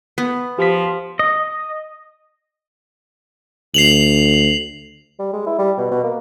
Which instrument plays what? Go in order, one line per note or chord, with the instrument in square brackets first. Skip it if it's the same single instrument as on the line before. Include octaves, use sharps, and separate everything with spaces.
[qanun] B3
[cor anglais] F3 [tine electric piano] G4 B6
[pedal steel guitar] D#5
[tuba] D2 [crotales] C7 F7 F#7
[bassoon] G3
G#3
E4
G3
B2
B2
A#3